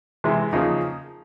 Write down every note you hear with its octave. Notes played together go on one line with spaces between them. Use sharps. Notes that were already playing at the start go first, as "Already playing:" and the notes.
C3 E3 G#3
C#3 F3 A#3 D#4